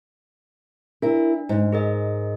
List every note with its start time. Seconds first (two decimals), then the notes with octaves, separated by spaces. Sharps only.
1.02 D4 E4 A#4
1.49 G#2
1.72 G#4 A#4 D#5